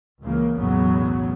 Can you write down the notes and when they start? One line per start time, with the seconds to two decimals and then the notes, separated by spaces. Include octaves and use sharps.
0.22 C#2 C#3 E3 A#3
0.58 B1 E2 A2 C#3 F#3 B3